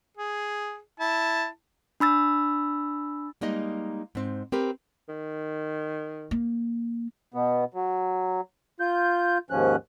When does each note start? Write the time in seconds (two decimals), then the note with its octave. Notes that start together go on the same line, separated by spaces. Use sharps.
0.17 G#4
1.00 E4 A5
2.00 D4 B5 E6 A6
3.41 G3 G#3 A#3 D#4 D#5
4.15 G#2 C4
4.52 C4 G4 A#4 B4
5.09 D#3
6.31 A#3
7.34 B2 B3
7.74 F#3
8.80 F4 G6
9.50 D#2 G#2 F3 C#4 F#6